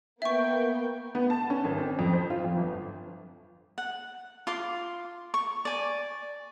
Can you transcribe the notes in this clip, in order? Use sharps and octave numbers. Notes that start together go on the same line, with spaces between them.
A#3 B3 E5 G5 C#6
B3
A5
C#4
G#1
C4
F2
C5
F4
F2
G1
F#5
F4 C6 D6
C#6
D5 G#5